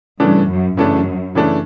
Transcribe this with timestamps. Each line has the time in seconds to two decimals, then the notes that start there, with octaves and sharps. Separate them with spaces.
0.19 G2 C#3 E3 A3 D4
0.48 F#2
0.77 F#2 C#3 E3 A3 D4
1.35 C#3 E3 A3 D4